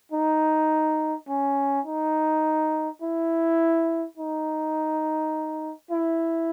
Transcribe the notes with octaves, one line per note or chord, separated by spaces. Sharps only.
D#4
C#4
D#4
E4
D#4
E4